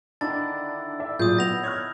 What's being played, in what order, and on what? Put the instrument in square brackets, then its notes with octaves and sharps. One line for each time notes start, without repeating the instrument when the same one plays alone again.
[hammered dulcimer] D3 D#3 E4 [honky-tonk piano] D4 [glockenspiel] A6
[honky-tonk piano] D5 E5
[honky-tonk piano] A#2 [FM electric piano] F#3 F4 G#4 [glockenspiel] D#6 G6
[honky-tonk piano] B3 [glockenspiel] A#6 F7
[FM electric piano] C#5 C#6 F#6 [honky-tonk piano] F6 G#6